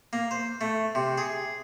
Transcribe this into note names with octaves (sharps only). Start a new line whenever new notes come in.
A#3
C5
A3
C3
G#4